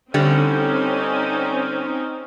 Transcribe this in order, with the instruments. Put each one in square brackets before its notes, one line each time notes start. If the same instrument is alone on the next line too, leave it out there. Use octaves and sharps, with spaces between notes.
[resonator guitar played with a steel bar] D3 G3 [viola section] C4 C#4 D#4